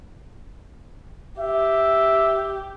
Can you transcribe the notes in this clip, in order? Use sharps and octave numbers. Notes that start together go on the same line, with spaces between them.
G4 E5